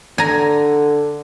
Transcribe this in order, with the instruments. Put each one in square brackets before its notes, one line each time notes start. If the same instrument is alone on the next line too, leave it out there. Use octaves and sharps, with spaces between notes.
[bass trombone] D3 [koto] G#5 A#5